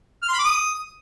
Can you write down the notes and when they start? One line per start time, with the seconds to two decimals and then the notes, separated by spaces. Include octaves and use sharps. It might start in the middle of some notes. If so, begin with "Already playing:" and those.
0.23 F6
0.28 C6
0.34 B5
0.39 D6
0.44 D#6